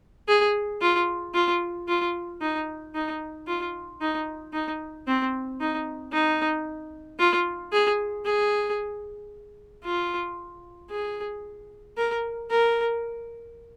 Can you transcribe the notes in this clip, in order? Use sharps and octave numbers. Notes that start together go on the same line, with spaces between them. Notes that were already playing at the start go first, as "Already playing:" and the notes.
G#4
F4
F4
F4
D#4
D#4
F4
D#4
D#4
C4
D#4
D#4
F4
G#4
G#4
F4
G#4
A#4
A#4